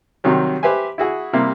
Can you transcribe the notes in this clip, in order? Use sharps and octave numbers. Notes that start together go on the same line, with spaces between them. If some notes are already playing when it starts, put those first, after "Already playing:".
C3 D#3 F#3 G3
G4 B4 C5 E5 G#5
E4 F#4 G#4
C3 G3 A#3 E4